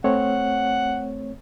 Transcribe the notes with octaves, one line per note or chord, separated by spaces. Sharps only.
A3 C4 C#5 F#5